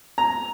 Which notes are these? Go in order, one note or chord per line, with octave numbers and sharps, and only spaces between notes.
A#5